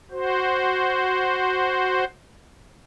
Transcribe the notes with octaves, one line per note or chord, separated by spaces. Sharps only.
F#4 C5